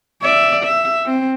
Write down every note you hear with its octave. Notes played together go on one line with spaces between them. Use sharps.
D5 E5
E5
C4